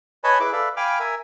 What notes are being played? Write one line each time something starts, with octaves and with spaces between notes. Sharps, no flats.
B4 C#5 D#5 G#5 A5 B5
E4 G#4 B4 D6
A4 B4 D5 E5 F5
F5 G5 G#5 B5 D6 F6
A#4 E5 G#5